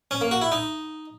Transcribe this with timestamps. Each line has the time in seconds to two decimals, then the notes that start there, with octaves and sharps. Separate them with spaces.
0.11 C#4
0.21 A#3
0.31 F#4
0.42 E4
0.52 D#4